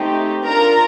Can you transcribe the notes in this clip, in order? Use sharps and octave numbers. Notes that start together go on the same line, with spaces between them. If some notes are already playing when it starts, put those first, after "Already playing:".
Already playing: A3 C4 D#4 G4
D4 F4 A4 A#4 A#5